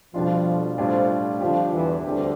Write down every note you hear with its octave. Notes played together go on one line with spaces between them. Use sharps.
F2 B2 F3 G3 D4 F4
F2 A2 F3 G3 D4 F4
F2 D3 F3 G3 D4 G4
E2 E3
D2 D3 G3 C4 G4